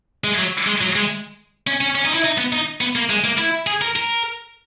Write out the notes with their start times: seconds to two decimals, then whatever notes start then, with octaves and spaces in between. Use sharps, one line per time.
0.24 G#3
0.38 F#3
0.67 G#3
0.81 F#3
0.96 G#3
1.67 C#4
1.81 C#4
1.95 C#4
2.06 D#4
2.14 E4
2.24 D#4
2.38 B3
2.53 D#4
2.81 B3
2.96 A#3
3.10 G#3
3.24 A#3
3.38 E4
3.67 G#4
3.82 A#4
3.96 A#4